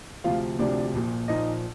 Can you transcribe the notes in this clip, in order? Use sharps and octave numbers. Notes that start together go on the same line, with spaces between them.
D2 C3 F3 F4 F5
D2 C3 F3 D4 D5
A#1 A#2 F3
A#1 A#2 F3 D#4 D#5